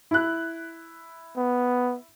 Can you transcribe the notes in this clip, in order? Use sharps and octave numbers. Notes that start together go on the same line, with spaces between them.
E4 F#6
B3